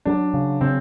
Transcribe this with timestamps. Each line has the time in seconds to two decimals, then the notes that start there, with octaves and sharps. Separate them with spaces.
0.05 F#3 D4
0.34 C#3
0.61 C#3 C4